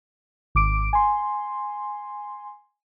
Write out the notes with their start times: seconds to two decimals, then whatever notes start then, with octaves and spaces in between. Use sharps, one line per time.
0.55 G#1 D6 D7
0.93 G#5 C6